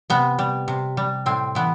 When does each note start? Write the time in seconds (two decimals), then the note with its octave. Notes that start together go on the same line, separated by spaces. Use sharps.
0.10 C3 B3
0.39 G3
0.68 C3
0.97 G3
1.26 A2 C4
1.55 E3 B3